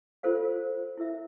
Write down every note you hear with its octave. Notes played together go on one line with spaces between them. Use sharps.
F4 A4 C5 F5
E4 A#4 E5